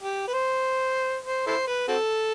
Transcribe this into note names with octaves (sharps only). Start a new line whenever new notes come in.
G4
B4
C5
C5
E4 A4 C5
B4
C4 F#4 A4